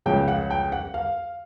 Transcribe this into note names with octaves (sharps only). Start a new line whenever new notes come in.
C#2 C#3 F3 G5
F5
F#5
G5
F#5
F5